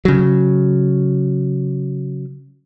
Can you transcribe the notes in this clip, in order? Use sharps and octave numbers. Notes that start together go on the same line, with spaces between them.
C#3 F#3